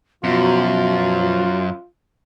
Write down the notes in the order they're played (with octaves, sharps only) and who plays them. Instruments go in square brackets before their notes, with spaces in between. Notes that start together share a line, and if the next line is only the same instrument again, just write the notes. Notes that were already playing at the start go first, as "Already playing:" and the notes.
[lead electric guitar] F#2 [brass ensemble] B2 F3 [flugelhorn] F4 [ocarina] F#4